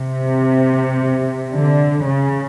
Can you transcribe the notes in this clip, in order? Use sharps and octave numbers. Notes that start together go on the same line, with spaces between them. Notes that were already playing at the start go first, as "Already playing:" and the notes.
Already playing: C3
D3
C#3